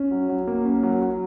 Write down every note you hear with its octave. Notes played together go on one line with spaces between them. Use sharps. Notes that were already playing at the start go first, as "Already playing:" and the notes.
Already playing: C#4
F#3
F#3
A#3
C#4
F#3
F#3